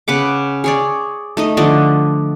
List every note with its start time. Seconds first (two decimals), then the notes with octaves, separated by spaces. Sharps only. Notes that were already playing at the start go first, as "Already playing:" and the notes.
0.08 C#3 B4 F#5 D6
0.64 G#4 C#5 D5
1.37 A3 D#4 D#5
1.57 D3 F3 D5 D#5